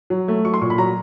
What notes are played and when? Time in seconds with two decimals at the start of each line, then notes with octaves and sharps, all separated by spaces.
0.10 F#3
0.28 A3
0.45 F#3 C#6
0.54 C6
0.61 A#2 C#6
0.70 B5
0.78 F#3 A#5